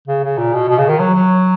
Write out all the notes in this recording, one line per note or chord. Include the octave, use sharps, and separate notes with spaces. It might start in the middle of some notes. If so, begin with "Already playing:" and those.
C#3
C#3
A#2
B2
B2
C#3
D#3
F#3
F#3